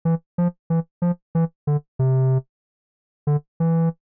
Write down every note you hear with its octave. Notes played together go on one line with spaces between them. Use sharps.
E3
F3
E3
F3
E3
D3
C3
D3
E3